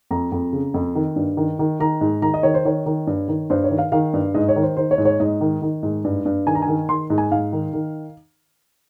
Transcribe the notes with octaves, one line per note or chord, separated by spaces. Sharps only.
F2 A#5
F2
C#3
F2
D#3
G2
D#3
D#3
D#3 A#5
G#2
D#3 A#5
D#5
D#3 C#5
C5
D#3 C#5
D#3
G2
D#3
G2 C5
C#5
D#3
F5
D#3 F5
G2
G#2 D#5
C#5
D#3
C5
D#3 C5
C#5
G#2
C#5
G#2 D#5
D#3
D#3
G#2
G2
G2
D#3 G#5
A#5
G#5
D#3
D#3 C6
G#2
G#5
G#2 F5
D#3
D#3